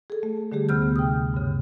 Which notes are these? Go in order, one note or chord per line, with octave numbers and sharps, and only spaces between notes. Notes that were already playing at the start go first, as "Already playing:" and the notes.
G#4 A4
A3
D3 G3 A3 G4 G#4
D2 C3 B3 F6 G6
G5 D#6
G2 C#3